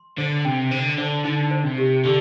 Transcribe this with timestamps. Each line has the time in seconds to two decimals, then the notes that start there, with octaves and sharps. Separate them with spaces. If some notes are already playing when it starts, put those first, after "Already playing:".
Already playing: C6
0.18 D3 C5
0.45 C3 G5
0.71 D3 C5
0.98 D3 C5
1.25 D3 D#4
1.51 C5
1.64 C3
1.78 G4
2.04 D3 G4